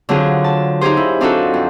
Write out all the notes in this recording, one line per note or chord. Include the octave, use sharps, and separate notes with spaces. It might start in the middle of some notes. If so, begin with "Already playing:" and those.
D3 F#3 C4 F4 G#4
A5
D#4 F4 G4 G#4 C5
E4
C4 D4 D#4 F4 F#4 A4
F2